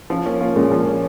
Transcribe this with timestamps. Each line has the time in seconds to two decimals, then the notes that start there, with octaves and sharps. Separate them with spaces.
0.10 F3 C#4 F4
0.25 A#3 C#4
0.40 A#3 F4
0.56 A#2 G#3 C#4
0.71 F3 A#3
0.87 C#4